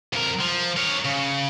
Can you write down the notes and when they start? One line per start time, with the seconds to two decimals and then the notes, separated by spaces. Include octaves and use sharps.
0.13 F2 A#4
0.40 F3
0.76 A#4 C#5
1.05 C#3